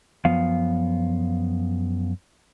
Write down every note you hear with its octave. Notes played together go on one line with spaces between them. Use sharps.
F#2 F3 B3 F5